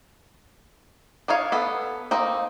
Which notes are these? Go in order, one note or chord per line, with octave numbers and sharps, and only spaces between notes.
D4 D#4 C#5 F5
B3 A4
A#3 C4 D#4